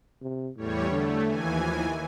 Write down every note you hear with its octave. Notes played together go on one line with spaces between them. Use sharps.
C3
E2 A2 G3 C#5
D3 A3
D#2 E3 G#5
F3